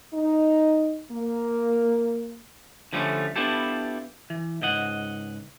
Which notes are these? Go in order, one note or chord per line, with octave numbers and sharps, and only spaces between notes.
D#4
A#3
D3 F3 G3 A3 C#4
B3 D4 E4 F4 G4 A4
E3
C#2 G#2 D#5 F#5